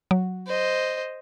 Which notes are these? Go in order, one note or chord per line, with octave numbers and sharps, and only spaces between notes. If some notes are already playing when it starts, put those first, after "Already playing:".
F#3
C5 D#5